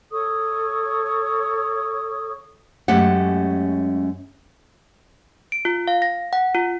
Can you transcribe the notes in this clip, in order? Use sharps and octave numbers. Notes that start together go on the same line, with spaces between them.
A4 C#5 C#6 D#6
F#2 G#3 A3 C#4 G4 F#5
D7
F4
F5
A#6
F#5
F4